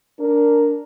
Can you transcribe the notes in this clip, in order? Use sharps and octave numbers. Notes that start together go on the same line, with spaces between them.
D4 A#4